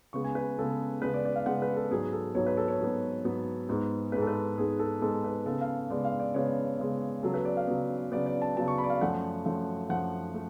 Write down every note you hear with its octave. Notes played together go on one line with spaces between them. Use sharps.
C#3 G#3 B3 C#6
G#5
B4
C#3 G#3 B3 A4
C#3 G#3 B3 B4
D5
D5
F5
C#3 G#3 B3 F#5
B4
A4
G#2 F#3 B3 G#4
A4
G#2 F#3 B3 C#5
B4
A4
C#5
G#2 F#3 B3
G#2 F#3 B3
G#2 G#3 B3
G#2 G#3 B3 B4
A4
B4
G#2 G#3 B3 G#4
A4
G#2 G#3 B3 A4
B4
C#3 G#3 B3 A4
F5
C#3 G#3 B3 D5
F5
D5
C#3 G#3 B3 C#5
C#3 G#3 B3
C#3 F#3 B3 A4
B4
D5
F5
C#3 F#3 B3
C#3 F#3 B3 D5
D5
A5
C#3 F#3 B3 A5
C#6
B5
D5
F5
F#2 F3 A3 F#5
F#2 F3 A3
F#2 F3 A3 F#5
A3